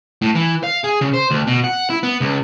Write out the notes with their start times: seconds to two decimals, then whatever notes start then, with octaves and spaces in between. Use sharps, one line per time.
0.22 A2
0.35 E3
0.63 F5
0.84 G#4
1.01 C#3
1.14 C5
1.31 D2
1.47 B2
1.64 F#5
1.90 E4
2.03 B3
2.21 C#2